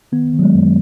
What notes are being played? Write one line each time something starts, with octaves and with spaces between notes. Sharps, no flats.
D#3 B3
D#3
F#3
G#3
F#2